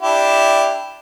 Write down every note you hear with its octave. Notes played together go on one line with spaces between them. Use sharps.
D4 E4 G4